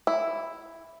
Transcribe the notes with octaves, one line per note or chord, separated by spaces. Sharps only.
E4